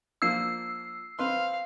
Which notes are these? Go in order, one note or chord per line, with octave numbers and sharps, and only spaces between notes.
F3 A#3 D4 E6 C7
C4 B4 F5 C6